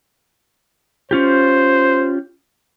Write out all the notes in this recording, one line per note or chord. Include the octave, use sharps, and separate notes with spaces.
C#4 F4 G4 C5